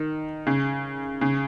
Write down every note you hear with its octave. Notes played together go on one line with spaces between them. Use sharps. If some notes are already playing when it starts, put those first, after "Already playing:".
Already playing: D#3
C#3
C#3